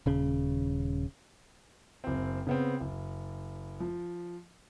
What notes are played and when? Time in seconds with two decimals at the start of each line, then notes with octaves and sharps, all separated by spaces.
0.06 D#1 C#3
2.04 F#1 C4
2.47 C#3 B3 C4
2.80 F#1
3.80 F3